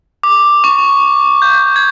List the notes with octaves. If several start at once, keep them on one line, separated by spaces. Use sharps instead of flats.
D6
C#6
G6
G#6